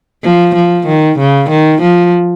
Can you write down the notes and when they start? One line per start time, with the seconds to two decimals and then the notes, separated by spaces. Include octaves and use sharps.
0.23 F3
0.55 F3
0.87 D#3
1.18 C#3
1.50 D#3
1.82 F3